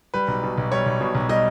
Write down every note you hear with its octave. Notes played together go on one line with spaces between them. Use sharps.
G3 B4
B1
B2
B1
G3 C#5
B1
B2
B1
G3 D#5